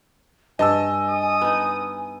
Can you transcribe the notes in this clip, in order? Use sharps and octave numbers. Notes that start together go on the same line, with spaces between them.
G2 D#5 G#5 A5 E6
D#6
B3 D#4